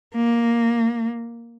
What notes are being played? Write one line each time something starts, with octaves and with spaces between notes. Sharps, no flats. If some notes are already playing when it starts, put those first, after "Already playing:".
A#3